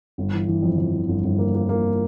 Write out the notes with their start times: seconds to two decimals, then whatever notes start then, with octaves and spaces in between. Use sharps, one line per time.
0.18 G1
0.33 E3
0.48 E3
0.63 F2
0.78 F2
0.93 E3
1.09 G1
1.24 G1
1.38 A#3
1.55 A#3
1.69 A#3